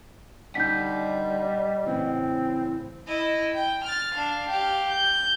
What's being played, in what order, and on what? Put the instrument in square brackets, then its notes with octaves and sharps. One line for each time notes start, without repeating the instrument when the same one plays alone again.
[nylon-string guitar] D3 D#4 [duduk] G3 [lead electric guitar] D#5 F#5 [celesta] G6 B6
[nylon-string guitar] A2 C#3 E3 [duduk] C4
[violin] E4 D#5
G5
F6 A6
D4 F5
G4 F5
G6